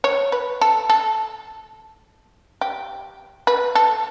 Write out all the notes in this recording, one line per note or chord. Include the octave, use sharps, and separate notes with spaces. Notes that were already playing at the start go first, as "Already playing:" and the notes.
C#5
B4
A4
A4
G4
B4
A4